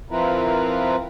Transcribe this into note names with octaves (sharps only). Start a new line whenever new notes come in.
F3 C4 E4 F4 A#4 B4